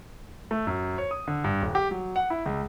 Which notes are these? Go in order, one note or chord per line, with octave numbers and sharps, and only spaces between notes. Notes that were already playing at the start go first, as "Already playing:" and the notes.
A3
F#2
C#5
D#6
D3
G2
D#1
G4
F#3
F#5
E4
C#2